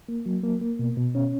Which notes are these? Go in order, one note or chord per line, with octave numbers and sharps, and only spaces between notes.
A#3
F#3
A#3
A#3
B2
B2
C#4